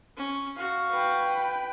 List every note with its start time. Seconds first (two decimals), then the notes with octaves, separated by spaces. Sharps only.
0.17 C#4
0.56 F#4 F5
0.91 B4 G5